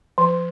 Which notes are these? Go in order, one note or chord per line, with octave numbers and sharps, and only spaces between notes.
F3